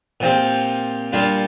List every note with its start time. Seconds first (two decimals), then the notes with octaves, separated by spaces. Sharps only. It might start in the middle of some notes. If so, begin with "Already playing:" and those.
0.20 A#2 F3 C4 G4
1.13 A#2 G3 D4 F4